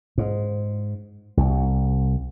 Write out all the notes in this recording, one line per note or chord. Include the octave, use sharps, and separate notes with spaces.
G#2
C2